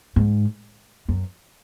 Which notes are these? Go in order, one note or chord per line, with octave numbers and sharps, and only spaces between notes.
G#2
F#2